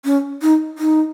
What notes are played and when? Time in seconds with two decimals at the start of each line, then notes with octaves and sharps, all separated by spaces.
0.05 C#4
0.42 D#4
0.78 D#4